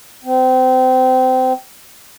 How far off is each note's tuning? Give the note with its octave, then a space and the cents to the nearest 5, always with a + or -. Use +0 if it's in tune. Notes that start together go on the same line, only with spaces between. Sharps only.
C4 -25